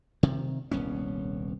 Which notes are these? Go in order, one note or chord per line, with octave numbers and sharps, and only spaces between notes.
C3 D#3
D#1 C2 B3 C#4